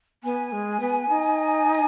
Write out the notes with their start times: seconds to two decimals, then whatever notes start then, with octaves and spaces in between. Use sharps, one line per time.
0.24 B3 G#5
0.52 G#3
0.80 B3
1.09 D#4